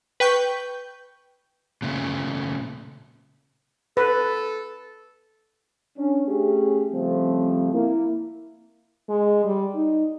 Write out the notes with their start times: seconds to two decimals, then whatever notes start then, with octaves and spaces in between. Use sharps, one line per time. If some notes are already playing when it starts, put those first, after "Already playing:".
0.20 B4 G5 C#6 G6
1.82 A#2 C#3 A3
3.97 A4 B4
5.98 C#4 D4
6.27 A3 C#4 G4 G#4
6.92 C#3 F3 G3 A3 C4
7.73 A#3 E4
9.09 G#3
9.45 G3
9.75 D#4